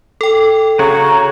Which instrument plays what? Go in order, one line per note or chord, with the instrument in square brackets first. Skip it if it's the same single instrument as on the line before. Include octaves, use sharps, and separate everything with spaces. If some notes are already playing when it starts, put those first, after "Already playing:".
[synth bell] A4 G5
[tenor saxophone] C#3 [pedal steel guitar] F#4 C#5 [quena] A#5